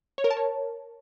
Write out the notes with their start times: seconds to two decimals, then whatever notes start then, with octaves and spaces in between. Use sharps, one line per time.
0.18 C#5
0.24 A#4
0.31 A5
0.37 C#5